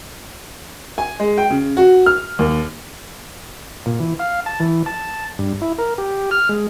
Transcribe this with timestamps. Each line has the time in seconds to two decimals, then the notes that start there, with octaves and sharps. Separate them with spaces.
0.98 G#5
1.20 G#3
1.38 G5
1.51 C#3
1.77 F#4
2.06 F6
2.39 D#2
3.86 A#2
4.00 E3
4.19 F5
4.46 A5
4.60 E3
4.86 A5
5.39 G2
5.61 E4
5.78 A#4
5.98 G4
6.31 F6
6.49 G#3